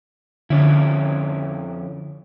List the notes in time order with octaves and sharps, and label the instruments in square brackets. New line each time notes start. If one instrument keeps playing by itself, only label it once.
[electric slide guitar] F2 C#4 E4 [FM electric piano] D3